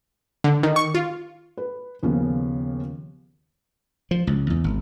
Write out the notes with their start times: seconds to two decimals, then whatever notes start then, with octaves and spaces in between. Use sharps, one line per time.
0.44 D3
0.63 D#3
0.76 C#6
0.95 F4
1.57 B4
2.03 D#2 C#3 F3 B3 C#4
4.11 F3
4.27 C#2
4.50 E2
4.64 G#1